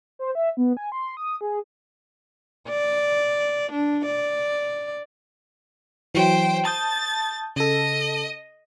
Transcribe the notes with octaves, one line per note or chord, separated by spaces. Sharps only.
C5
E5
B3
G#5
C6
D#6
G#4
D5
D4
D5
E3 F#3 E4 C5 G5
A5 D#6 G6 A6
C#3 A4 D#5